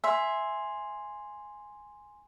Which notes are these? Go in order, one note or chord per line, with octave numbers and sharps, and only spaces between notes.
E5 G#5 C6